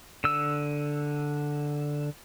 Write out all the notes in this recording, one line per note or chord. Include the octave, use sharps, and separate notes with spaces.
D3 E6